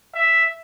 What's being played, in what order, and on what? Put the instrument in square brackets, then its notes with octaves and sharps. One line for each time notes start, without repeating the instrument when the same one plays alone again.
[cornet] E5